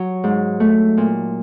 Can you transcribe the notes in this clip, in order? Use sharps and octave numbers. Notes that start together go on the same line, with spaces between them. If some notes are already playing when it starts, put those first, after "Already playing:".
Already playing: F#3
G#2
A3
A#2